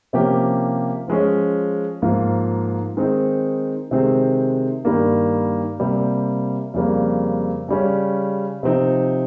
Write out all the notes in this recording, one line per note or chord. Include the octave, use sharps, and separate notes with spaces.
C3 F3 A#3 C#4 G4
F3 G#3 C#4
G#2 F3 A#3 F4
D#3 G#3 C4 D#4
C3 D#3 G#3 C4
G2 D#3 G3 A#3
C3 G3 A#3
F2 C#3 G3 A#3
C#3 G3 C#4
C3 F3 C4 D#4